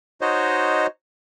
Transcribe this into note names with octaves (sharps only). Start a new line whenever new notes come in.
D#4 F#4 C5 C#5 D#5